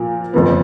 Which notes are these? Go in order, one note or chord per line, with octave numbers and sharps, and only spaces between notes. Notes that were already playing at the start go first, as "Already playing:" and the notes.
Already playing: A#2 F3 A#3
F#1 F2 F3 B3